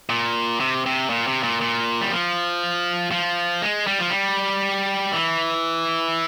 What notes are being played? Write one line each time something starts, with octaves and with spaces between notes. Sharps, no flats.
A#2
C3
C3
A#2
C3
A#2
A#2
G3
F3
F3
G#3
G3
F3
G3
E3